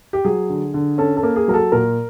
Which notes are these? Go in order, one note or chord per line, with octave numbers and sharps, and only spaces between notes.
G4
F#3 G#4
D3
D3
C#4 A4
A4
A#3
G#4
F#3 A#4
A4
A#2 A#4